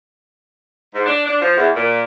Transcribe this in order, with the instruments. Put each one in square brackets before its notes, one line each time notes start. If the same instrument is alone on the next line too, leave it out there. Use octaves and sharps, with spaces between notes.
[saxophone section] G#2
D4
D4
F3
E2
A#2